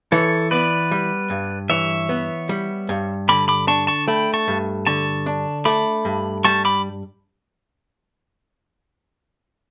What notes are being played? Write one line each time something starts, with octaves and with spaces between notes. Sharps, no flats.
E3 A4 C#5
B3 B4 D5
G3
G2
E3 C#5 E5
B3
G3
G2
D3 B5 D6
B5 D6
D4 A5 C#6
A5 C#6
A3 G5 B5
A5 C#6
G2
D3 A5 C#6
D4
A3 B5 D6
G2
G3 A5 C#6
B5 D6